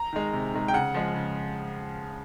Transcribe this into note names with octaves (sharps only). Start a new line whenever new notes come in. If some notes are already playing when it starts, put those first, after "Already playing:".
Already playing: A#5
D#3 G#3
C3
D#3 G#3
G5
C#3 F#5
F3 G#3
C#3